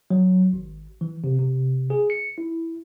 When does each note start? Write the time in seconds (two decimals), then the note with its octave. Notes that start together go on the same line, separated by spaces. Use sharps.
0.10 F#3
0.53 G#1
1.01 E3
1.24 C3
1.39 C3
1.90 G#4
2.10 C#7
2.38 E4